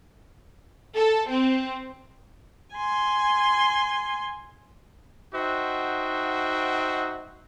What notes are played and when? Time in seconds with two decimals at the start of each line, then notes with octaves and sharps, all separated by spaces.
0.96 A4
1.29 C4
2.75 G#5 C6
5.34 D#4 F#4 C5 E5 F#5 G5